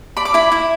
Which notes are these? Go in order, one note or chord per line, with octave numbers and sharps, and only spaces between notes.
D5 B5
D6
E4 B5
E4